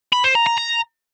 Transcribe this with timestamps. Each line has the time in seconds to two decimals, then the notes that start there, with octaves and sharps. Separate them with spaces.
0.13 B5
0.24 C5
0.35 A#5
0.47 A#5
0.58 A#5